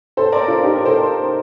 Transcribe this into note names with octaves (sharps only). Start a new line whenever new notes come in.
A4 C5
A#4 D5
F4 A4
D#4 G4
A#4
A4 C5